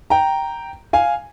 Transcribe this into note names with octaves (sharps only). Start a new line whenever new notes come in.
G5 A#5
F5 G#5